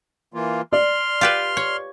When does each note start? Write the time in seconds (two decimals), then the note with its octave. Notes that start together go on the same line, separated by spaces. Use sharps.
0.34 E3 A#3 F4
0.72 D5 C6 F6
1.21 F4 G4 B4
1.57 C#5